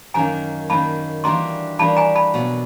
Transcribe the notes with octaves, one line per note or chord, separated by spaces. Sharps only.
F#2 D#3 F#3 A#3 G#5 A#5
F#2 D#3 F#3 A#3 A5 B5
E3 G3 A#3 D4 F#4 A#5 C6
E3 G3 A#3 D4 F#4 A5 B5
G#5 A#5
A5 B5
B2 F#3 B3